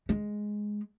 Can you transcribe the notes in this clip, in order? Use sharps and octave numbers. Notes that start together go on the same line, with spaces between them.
G#3